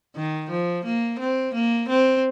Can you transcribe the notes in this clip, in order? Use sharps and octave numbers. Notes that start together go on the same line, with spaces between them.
D#3
F3
A#3
C4
A#3
C4